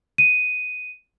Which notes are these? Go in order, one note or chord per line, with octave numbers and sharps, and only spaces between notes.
D#7